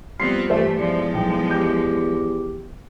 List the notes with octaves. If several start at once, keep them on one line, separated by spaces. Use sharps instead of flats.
F3 G3 B3 C4 C6 F6 C7
G2 E3 A3 G4 C5 E5
E2 F3 G#3 D5
B1 G5
G4 G6